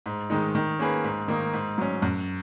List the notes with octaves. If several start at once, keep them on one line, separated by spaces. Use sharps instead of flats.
G#2
D#3 G#3 D#4
D#3
A#3 C#4 G#4 B4
G#2
D#3 A#3 D#4
G#2
F#3 C#4
F#2